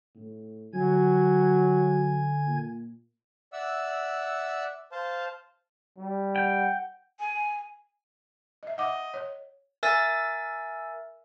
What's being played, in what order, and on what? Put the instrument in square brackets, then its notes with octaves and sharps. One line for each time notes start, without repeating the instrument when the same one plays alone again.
[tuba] A2
[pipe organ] D3 G#5 G#6 [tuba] F#3
[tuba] A#2
[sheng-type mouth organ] D5 E5 F#5 E6
C5 F5 A5
[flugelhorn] G3
[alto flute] F#5 [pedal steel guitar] G5
[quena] G#5
[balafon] D#5 E5
[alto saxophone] D#5 [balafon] F#5 D6
[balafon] C#5
[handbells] A#4 E5 G#5 E6 A6